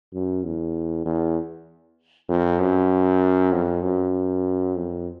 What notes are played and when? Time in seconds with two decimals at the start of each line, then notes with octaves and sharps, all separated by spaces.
0.13 F#2
0.44 E2
1.05 E2
2.29 F2
2.59 F#2
3.52 F2
3.82 F#2
4.76 F2